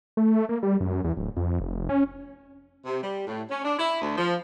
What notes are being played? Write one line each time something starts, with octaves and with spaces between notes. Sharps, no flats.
A3
A#3
G3
F#2
E2
D1
F2
F1
C#4
C3
G3
A2
C#4
D4
E4
D2
F3